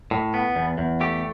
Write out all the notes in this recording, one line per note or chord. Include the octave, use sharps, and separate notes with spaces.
A2
B3
E2
E2
A3 G4